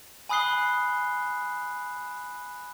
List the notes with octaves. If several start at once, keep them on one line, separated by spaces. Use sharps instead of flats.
G#5 B5 D#6 F#6 C7 G7